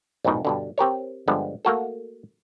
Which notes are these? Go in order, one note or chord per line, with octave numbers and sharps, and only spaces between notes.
A#1 F2 G#2 B2 D#4
G2 B2 D3
C4 G4 A#4 C#5
G2 D3 F3 G#3 B3
A3 A#3 F#4 A4